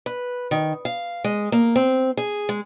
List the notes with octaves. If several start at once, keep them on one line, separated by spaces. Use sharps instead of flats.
B4
D#3
F5
G#3
A#3
C4
G#4
G#3